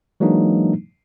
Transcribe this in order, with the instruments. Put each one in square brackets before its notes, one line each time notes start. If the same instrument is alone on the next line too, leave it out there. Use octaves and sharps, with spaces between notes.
[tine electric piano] E3 F#3 G#3 A#3 D4 D#4